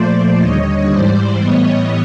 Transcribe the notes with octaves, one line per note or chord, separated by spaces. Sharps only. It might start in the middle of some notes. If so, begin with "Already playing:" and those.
Already playing: A#2 F3 A3 C5 D5
D#2 D3 G3 C#5 D#5
G#2 E3 G3 C5 D5
A2 E3 G3 B3 C#5 D#5